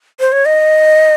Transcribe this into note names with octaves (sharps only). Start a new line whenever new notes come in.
C5
C#5
D#5